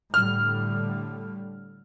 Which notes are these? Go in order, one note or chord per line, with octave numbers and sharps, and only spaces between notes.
A2 D3 G3 F6